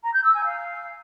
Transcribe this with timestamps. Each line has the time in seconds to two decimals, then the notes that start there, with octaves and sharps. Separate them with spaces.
0.03 A#5
0.13 G6
0.24 E6
0.34 G#5
0.44 F5